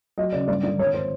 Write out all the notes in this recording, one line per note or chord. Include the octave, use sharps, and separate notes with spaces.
F#3 D#5
C#3 D5
G2 D5
D3 D5
G#1 C#5
C5